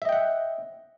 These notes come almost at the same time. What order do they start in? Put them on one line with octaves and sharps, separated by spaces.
E5 D#5 G5 F#5